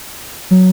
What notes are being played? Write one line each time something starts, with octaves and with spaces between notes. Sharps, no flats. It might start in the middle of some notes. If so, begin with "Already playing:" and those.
F#3